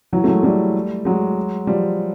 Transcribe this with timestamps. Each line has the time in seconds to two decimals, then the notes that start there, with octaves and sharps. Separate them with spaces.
0.13 E3 F#3
0.24 A3
0.28 F#3 G#3
0.43 G3 A3
1.05 F#3 G#3
1.67 F3 G3